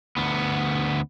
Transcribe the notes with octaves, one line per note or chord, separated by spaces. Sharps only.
D2 B3